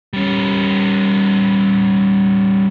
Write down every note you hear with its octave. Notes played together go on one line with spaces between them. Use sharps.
G3 C#4